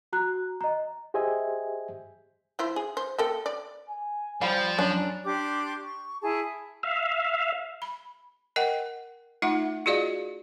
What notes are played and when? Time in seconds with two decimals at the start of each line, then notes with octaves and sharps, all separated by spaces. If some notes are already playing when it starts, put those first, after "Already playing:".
0.13 F#4 A#5 F#6
0.61 D#5 A#5
1.14 G4 G#4 C5 D#5 E5 G#5
2.59 F3 E4 C5
2.76 G#4
2.97 C5
3.18 A#3 A4 G5
3.46 D5
3.89 G#5
4.42 F3 G3 C5 F5 B5
4.79 F#2 C#4 D4 F#7
5.25 D4 G4 C6 D6
5.83 C#6
6.21 E4 G#4 A5
6.83 E5 F5
7.82 B5
8.56 A#4 D#5 F#5 G5
9.42 A3 D#4 F4 E5 F#5 D6
9.86 F4 F#4 G#4 D5 D#5 F5